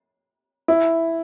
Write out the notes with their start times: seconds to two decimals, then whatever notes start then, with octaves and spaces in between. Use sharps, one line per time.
0.68 E4